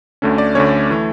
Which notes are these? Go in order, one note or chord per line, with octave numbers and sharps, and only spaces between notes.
D2 D3 A3 C#4
D5
D2 D3 A3 C#4 C#5
E3 A3